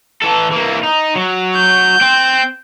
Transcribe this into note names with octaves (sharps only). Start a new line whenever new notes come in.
E3 A4
E3 A#3
D#4
F#3
G6
C4